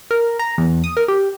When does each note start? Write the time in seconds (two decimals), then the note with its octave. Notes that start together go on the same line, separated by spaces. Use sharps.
0.11 A#4
0.39 A#5
0.58 E2
0.84 D#6
0.97 A#4
1.08 G4